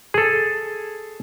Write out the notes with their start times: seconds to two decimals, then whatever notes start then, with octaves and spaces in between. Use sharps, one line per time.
0.14 G#4 A4